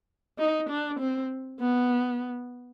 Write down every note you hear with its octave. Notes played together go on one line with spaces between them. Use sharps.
D#4
D4
C4
B3